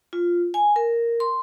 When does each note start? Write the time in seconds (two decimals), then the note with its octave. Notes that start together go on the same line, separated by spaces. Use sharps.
0.13 F4
0.54 G#5
0.76 A#4
1.20 C6